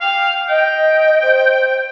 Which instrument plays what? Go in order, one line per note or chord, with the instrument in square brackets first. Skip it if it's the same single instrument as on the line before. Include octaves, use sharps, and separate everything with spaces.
[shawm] F5 [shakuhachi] G5
[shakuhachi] D#5 [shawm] G5
[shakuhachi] C5